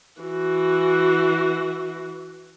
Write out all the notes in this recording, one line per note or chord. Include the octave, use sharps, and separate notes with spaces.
E3 F#4